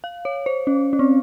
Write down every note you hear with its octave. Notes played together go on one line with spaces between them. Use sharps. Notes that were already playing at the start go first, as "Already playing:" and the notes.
F5
C#5
C5
C#4
C#4
C4